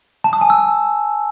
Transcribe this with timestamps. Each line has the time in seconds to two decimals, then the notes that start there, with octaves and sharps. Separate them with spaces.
0.24 A5
0.33 D#6
0.41 G#5
0.50 E6